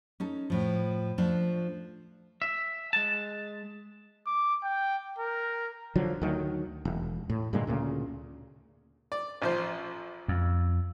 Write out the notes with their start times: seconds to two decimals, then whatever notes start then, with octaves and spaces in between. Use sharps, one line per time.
0.20 C#4 D#4 A4
0.50 A2 F3
1.18 F3 A3 D4 F4
2.42 E5
2.93 G#3 A5
4.26 D6
4.64 G5
5.19 A#4
5.95 D3 F3 F#3
6.22 D2 D#3 F#3
6.85 E1
7.30 A2
7.53 G2 A#2 D3 G#3
7.67 D2 A#2 C#3
9.12 D5
9.42 A1 F3 C5
10.28 F2